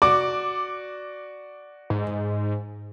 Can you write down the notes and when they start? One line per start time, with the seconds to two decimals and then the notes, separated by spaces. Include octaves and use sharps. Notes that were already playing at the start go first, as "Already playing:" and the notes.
0.02 F#4 D5 D6
1.90 G#2